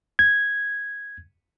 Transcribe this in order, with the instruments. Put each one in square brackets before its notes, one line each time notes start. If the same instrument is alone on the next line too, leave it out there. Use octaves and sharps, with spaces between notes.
[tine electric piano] G#6